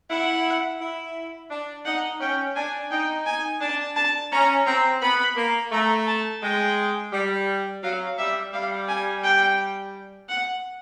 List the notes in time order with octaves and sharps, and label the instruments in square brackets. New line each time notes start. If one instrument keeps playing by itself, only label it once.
[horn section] E4 [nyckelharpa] F#5
[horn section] E4
D4
[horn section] D#4 [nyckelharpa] F#5
[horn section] C#4 [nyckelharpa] G5
[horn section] D4 [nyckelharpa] G#5
[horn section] D#4 [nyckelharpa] G5
[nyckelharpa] G#5
[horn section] D4 [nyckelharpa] A5
[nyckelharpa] A5
[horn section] C#4 [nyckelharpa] A#5
[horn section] C4 [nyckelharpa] A#5
[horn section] B3 [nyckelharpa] B5
[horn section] A#3
[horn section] A3 [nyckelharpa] A#5
[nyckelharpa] A5
[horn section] G#3 [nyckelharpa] G5
[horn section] G3
[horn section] F#3 [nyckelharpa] F5
[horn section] G3 [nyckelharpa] E5
[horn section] G3 [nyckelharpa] F5
[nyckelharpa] G#5
G5
F#5